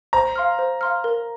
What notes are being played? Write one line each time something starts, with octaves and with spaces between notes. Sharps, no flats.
C5 A#5
F5 C6 F6
C5
F5 C6 F6
A#4